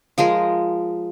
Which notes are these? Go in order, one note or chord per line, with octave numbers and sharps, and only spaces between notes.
F3 G#3 G#4 A#4